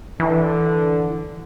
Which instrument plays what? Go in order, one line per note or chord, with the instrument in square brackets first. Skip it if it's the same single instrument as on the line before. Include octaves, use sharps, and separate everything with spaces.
[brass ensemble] D3 [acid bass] E3